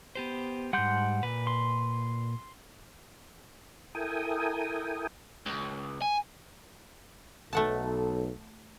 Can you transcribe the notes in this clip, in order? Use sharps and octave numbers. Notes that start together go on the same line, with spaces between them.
B3 G4 C5
G#2 G3 F#5 C6 G6
A#2 B4
C6
E4 A4 A#4 G5 G#5 D#6
C#2
G#5
B1 A3 A4 F#5 A5